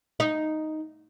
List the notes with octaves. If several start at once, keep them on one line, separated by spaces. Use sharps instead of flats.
D#4